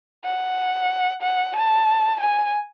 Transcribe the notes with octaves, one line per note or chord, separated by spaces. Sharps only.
F#5
F#5
A5
G#5